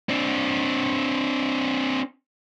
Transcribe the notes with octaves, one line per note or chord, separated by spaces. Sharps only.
C4 D4